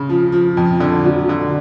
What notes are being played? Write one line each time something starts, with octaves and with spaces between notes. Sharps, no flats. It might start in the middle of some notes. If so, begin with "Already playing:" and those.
Already playing: C#3
F3
F3
F2
D3
F#3
D3